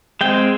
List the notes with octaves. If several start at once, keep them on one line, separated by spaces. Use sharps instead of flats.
G#3 C4 G5